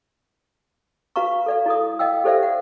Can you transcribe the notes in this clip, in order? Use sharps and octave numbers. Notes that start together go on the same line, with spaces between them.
F#4 B4 F5 A#5 C#6
A4 D5 F5
E4 A4 D#6
D#5 F5 G5 E6
G4 A4 C5 D5 E5 F5
F#5